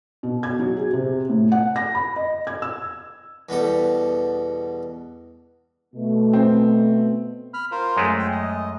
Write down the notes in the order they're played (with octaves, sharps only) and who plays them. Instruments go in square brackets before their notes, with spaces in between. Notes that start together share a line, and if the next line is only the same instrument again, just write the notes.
[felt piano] B2
G#6
F#3
G#4
C3
A2
F#5
A#6
B5
D#5
G#6
E6
[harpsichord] E2 B2 G3 A4
[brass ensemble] B2 A3
[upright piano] C4
[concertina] B5 F6
F4 A#4 C5
[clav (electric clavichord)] F#2 G#3 A3
[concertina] G5
D#5